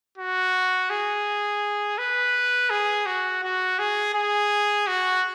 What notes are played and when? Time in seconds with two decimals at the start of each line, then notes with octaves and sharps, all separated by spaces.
0.18 F#4
0.90 G#4
1.98 B4
2.70 G#4
3.06 F#4
3.43 F#4
3.79 G#4
4.14 G#4
4.87 F#4